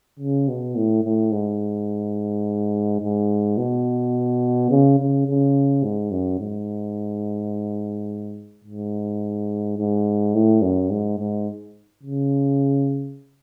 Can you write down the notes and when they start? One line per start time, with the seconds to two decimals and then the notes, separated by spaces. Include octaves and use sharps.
0.19 C#3
0.48 B2
0.76 A2
1.04 A2
1.32 G#2
3.01 G#2
3.58 B2
4.70 C#3
4.99 C#3
5.27 C#3
5.83 G#2
6.11 F#2
6.39 G#2
8.65 G#2
9.78 G#2
10.34 A2
10.62 F#2
10.90 G#2
11.19 G#2
12.03 C#3